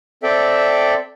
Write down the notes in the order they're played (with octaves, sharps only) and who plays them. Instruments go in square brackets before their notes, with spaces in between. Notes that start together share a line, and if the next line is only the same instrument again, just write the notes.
[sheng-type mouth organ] C4 A4 D5 E5 G5